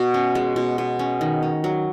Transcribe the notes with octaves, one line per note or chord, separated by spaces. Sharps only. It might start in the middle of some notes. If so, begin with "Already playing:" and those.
Already playing: B2 F#4 F#5
C#4
G#3
B2
B2
C#4
D#3
C#4
F#3